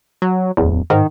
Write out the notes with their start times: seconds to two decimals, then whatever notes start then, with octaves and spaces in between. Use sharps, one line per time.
0.22 F#3
0.57 D1 E2
0.90 G#2 D#3